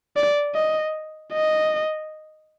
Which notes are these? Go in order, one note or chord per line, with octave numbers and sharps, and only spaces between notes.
D5
D#5
D#5